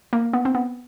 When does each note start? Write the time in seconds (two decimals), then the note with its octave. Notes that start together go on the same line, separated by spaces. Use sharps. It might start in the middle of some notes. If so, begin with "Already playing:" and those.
0.13 A#3
0.33 B3
0.45 C4
0.55 B3